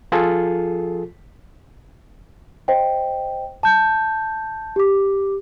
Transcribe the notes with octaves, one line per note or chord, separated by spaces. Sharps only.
F3 F4 G#4 A4
C5 D#5 G5
A5 G6
G4 D6